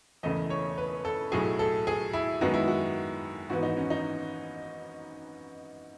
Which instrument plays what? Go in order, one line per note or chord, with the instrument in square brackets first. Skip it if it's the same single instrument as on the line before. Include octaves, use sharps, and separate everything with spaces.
[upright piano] E1 E2 C#3 E3 A3 D#5
C#5
B4
A4
B1 A2 F#3 A3 G#4
A4
G#4
E4
F#2 D#3 G#3 B3 F#4
E4
F#4
G#1 G#2 E3 B3 F#4
D#4
C#4
D#4